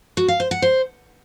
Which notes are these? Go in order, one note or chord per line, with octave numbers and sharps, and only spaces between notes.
F#4
F5
C5
F#5
C5